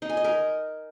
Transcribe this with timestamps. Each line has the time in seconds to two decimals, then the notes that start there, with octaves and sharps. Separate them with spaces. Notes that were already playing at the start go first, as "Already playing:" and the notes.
0.02 D#4
0.09 G#5
0.17 D#5
0.24 A#4